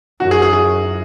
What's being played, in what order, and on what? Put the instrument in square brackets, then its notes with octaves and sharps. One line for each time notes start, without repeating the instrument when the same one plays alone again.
[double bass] F#2 [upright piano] F#4
[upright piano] G#4
G#4
G#4